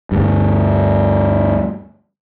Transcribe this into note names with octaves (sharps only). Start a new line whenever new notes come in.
D2 G2